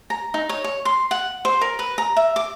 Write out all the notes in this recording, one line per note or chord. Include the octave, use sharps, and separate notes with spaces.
A#5
D#4
C#5
C#5
C6
F#5
C5
A#4
B4
A#5
E5
D6